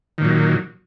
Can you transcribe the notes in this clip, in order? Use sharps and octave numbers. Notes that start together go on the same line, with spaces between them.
A#2 D#3 F#3